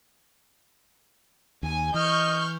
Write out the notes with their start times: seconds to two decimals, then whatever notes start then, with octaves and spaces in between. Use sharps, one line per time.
1.63 D#2 G#5
1.94 E3 D#5 C#6 F6 G6